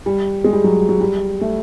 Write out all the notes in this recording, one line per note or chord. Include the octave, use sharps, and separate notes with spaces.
G3
G#3
G3
F#3
F#3
G3
A3